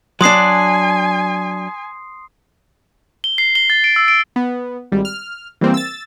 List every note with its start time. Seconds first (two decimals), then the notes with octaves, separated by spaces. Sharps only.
0.21 F#3 D4 G#5 C6 D#6 C7
3.24 G7
3.38 C7
3.55 G7
3.70 A6
3.84 D7
3.96 E6
4.08 D7
4.36 B3
4.92 G#1 G3
5.05 F6
5.61 E3 G3 A#3 C4
5.74 E6 A6